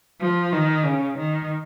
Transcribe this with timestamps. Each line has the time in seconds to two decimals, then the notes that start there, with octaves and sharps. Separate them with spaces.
0.21 F3
0.52 D#3
0.85 C#3
1.17 D#3